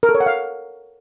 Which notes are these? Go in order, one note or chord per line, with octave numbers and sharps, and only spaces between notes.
A#4
A4
C#5
F#5
F5